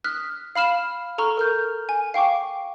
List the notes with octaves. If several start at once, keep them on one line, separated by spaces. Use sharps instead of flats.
D#6 F6 F#6 B6
F5 B5 F6 E7
A4 A#5 C#6 F6
A#4 F6 G6
G#5
F5 G5 C#6 D6